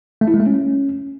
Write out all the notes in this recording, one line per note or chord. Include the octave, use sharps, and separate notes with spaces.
A3
E4
G#3
A3
C#4